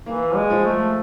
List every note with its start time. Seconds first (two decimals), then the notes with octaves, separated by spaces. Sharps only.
0.06 E3 A#3
0.35 G#3
0.50 F3
0.65 A3